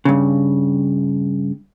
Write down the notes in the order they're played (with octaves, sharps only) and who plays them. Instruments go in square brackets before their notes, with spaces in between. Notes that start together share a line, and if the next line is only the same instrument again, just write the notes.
[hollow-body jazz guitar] G2 C#3